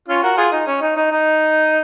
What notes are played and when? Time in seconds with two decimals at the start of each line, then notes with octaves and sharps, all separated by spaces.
0.08 C#4 F4
0.23 F#4 A#4
0.37 F4 G#4
0.52 D#4
0.67 C#4
0.81 D#4
0.96 D#4
1.12 D#4